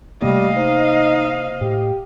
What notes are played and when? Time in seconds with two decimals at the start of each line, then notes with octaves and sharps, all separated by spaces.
0.22 C3 G3 A3 A#3 D5 D#5 F5
0.57 D#4 C5
1.61 A2 G4